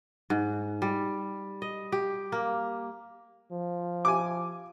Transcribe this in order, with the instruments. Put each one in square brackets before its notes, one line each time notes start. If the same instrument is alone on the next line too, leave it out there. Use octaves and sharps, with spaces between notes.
[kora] G#2
G3
D#5
G4
A#3
[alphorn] F3
[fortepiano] G#5 D6